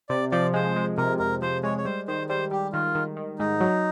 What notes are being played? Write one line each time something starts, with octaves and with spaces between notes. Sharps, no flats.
C3 D5
F3 D5
G#3 C5
G#3
C3 A#4
F2 A#4
F3 C5
G#3 C#5
C#5
G3 C5
D#3 C5
G3 C5
G3 G4
D#3 F4
D#3
D#3
G#2 D#4
F#3